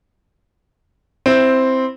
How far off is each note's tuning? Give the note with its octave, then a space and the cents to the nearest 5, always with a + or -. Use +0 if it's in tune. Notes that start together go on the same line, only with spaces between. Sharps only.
C4 +0 E4 +0